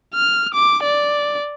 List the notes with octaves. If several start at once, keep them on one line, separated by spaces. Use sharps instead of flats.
F6
D6
D5